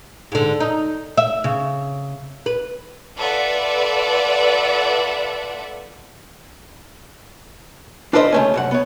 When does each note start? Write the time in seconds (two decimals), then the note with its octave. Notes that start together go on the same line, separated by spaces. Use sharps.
0.32 G#2 D3
0.60 D#4
1.18 E5
1.44 C#3
2.46 B4
3.17 F4 A4 B4 D5 E5 F#5
8.13 D4 F4 A4 B4 C5 D#5
8.32 C#3 A3 C#4
8.54 C2 F#2 F#5
8.71 B3 C#5